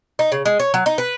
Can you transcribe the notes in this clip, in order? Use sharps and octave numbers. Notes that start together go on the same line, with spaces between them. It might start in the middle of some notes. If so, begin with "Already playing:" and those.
D#4
C#3
G#3
C#5
F#3
D#4
B4